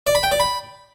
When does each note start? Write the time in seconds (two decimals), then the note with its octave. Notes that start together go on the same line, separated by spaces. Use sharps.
0.07 D5
0.15 B5
0.23 G5
0.31 D5
0.40 B5